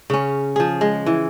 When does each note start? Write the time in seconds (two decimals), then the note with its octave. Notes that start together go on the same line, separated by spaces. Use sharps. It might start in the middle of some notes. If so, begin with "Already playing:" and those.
0.10 C#3 C#4
0.56 F3 G#4
0.81 G#3
1.06 E3